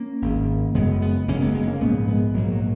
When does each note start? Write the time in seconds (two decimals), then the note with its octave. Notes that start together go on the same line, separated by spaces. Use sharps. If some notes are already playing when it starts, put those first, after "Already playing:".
Already playing: A#3 C#4
0.22 G#1 G#2
0.74 F#1 F#2 C#3 G#3 B3
1.01 G#3 B3
1.28 F#1 F#2 C#3 A#3 C#4
1.41 G#3 B3
1.54 G#3 B3
1.67 A#3 C#4
1.81 A#1 G#2 G#3 B3
2.08 G#3 B3
2.34 A#1 G#2 F#3 A#3
2.52 F#3